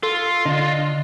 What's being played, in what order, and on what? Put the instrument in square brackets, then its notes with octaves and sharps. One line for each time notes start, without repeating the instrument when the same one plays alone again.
[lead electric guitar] F4 [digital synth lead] A4
[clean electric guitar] D3 D4 [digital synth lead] D#5